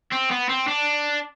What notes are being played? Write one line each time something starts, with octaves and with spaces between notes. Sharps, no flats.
C4
B3
C4
D4